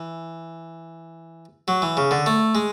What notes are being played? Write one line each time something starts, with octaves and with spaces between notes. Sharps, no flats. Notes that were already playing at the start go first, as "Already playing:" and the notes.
Already playing: E3
F#3
E3
C#3
D3
A3
G#3